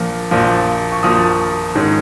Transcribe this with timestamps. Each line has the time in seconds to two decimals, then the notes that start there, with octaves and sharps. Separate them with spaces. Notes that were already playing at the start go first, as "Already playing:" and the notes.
Already playing: A#1 A#2 F3
0.31 A#1 A#2 F3
0.92 C#6
1.03 A#1 A#2 F3 D#6
1.75 G#2 D#3 G#3 C#4